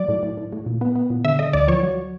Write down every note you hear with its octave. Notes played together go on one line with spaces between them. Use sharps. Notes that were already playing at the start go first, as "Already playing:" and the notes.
Already playing: F#3 D5
A2
A2
A2
A2
A#2
B3
B3
A#2
D3 E5
D3 D#5
D2 D5
F3 C#5
F#3